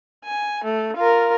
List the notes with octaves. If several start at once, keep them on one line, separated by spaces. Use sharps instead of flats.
G#5
A3
F4 A#4